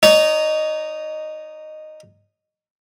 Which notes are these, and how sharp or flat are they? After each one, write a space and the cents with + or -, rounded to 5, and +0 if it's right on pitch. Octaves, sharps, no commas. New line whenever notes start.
D#4 -10 C#5 +40